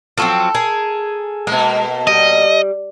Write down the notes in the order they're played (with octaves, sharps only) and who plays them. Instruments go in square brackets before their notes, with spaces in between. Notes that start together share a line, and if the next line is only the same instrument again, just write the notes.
[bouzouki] F3 F#3 C4 [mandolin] A4
[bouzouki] G#4 A#4
[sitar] B2 A#3 [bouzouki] G#3
[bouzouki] G3 [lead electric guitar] D#5